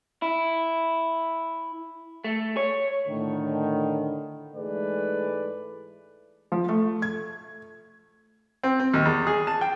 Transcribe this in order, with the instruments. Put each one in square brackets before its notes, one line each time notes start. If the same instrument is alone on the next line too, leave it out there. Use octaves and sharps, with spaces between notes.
[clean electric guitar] E4
A3
C#5
[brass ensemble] A2 D3 D#3
G#2 E3 G#3 A3 B4 D5
[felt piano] F3
A3
G#6
[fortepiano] C4
C4
D#2
E2
G#4
A5
G5